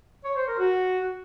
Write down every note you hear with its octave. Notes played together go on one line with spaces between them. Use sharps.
C#5
C5
A#4
F#4